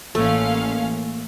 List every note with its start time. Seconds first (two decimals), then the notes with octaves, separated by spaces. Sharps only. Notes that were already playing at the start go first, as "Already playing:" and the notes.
0.15 A1 A3 A#3 C#4 F5